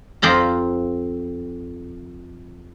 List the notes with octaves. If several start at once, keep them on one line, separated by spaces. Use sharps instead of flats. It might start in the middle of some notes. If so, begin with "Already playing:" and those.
F2 C4 F4 A#5